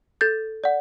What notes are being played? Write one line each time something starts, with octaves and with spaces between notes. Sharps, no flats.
A4 G6 A6
D5 F#5